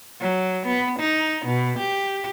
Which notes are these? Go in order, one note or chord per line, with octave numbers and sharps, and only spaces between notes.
F#3
B3
D#4
B2
G4